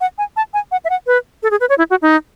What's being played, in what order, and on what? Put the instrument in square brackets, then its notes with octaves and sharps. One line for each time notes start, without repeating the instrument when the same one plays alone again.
[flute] F#5
G#5
A5
G#5
F#5
E5
F#5
B4
A4
G#4
B4
C#5
E4
F#4
D#4